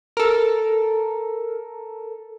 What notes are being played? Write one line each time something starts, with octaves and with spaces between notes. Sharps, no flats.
A4 A#4